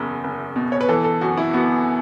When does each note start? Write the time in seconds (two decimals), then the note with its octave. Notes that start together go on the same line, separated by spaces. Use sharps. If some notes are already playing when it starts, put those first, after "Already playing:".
Already playing: F#1 E2
0.24 F#1
0.56 B2
0.72 C#5
0.81 B4
0.89 E3 A4
1.04 A4
1.21 F#2 F#4
1.37 E4
1.53 B3 F#4